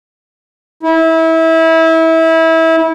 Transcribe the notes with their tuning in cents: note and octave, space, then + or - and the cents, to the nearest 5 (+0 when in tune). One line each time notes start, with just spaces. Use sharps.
E4 -25